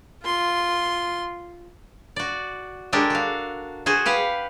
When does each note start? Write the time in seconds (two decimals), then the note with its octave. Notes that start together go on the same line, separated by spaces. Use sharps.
0.24 F4 C6
2.16 F#4 D5
2.93 G#3 D4 G4 A4 A#4
3.10 F#4 F5
3.86 F#4 G#4 C5
4.06 G4 B4 F5 F#5